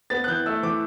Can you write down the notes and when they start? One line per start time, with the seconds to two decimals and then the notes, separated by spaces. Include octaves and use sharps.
0.10 B3 A6
0.24 F#6
0.27 E3 G6
0.46 A3 E6
0.63 E3 D6